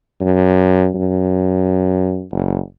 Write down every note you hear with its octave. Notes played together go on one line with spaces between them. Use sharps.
F#2
F#2
F#1